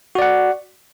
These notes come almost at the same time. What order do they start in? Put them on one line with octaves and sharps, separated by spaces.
F#4 D5 F#5